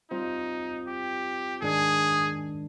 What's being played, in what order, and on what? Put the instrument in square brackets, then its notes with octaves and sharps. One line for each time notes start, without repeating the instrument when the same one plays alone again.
[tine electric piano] G3 C4 F4 C5 [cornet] D#4
[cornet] G4
[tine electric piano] G#2 D#3 G#3 D4 [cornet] G#4